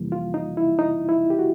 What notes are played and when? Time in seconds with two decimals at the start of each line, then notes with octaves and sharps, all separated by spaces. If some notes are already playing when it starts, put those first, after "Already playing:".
Already playing: F2 C3 E3 G3 A#3
0.12 F4
0.34 D#4
0.57 E4
0.79 D#4
1.09 E4
1.30 G4
1.39 F#4